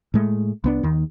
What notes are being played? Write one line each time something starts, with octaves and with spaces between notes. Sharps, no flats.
A2 G#3 A3
C2 B3 D4
D#2 D#3